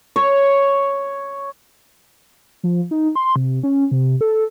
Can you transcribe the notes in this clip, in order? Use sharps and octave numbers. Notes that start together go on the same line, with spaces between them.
C#5
F3
D#4
C6
C3
C#4
C3
A4